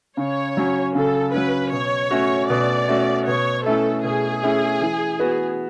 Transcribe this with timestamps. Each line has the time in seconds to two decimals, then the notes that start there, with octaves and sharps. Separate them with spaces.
0.17 C#3 C#5
0.57 F#3 C#4
0.95 C#3 A4
1.34 F#3 C#4 B4
1.72 B2 C#5
2.11 A3 C#4 F#4
2.50 B2 D5
2.88 A3 C#4 F#4
3.26 B2 C#5
3.66 A3 C#4 E4 A4
4.04 B2 G#4
4.43 A3 C#4 E4
4.81 E3
5.20 B3 F#4